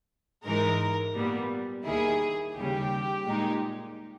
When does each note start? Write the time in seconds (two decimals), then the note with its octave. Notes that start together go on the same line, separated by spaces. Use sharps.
0.45 G#2 E3 G#3 D#4 A#4
1.15 A#2 G3 B3
1.86 D#2 D#3 A#3 E4 G#4
2.56 D#2 C#3 G3 G4
3.26 A#2 G#3 D#4